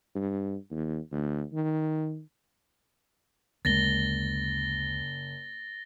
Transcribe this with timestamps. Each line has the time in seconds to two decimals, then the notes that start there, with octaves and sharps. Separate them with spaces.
0.15 G2
0.71 D#2
1.12 D2
1.53 D#3
3.65 F#1 D2 G#3 A6 A#6 G7